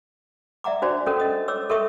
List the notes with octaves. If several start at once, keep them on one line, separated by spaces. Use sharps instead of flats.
D5 E5 F#5 A#5 D6
D4 F#4 C5 D5
C#4 A4 A#4 D#6
D#5 D#6
C#5 D6 E6
A4 A#4 E5 C#6 D#6